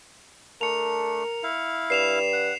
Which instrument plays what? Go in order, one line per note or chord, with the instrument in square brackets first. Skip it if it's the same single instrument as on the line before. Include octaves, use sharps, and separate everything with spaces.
[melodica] A3 D4 [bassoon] A#4 [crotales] C#7 F7
[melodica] E4 F5
[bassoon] G2 [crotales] C7 E7 F7
[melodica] F#5